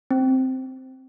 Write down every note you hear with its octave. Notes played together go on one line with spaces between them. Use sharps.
C4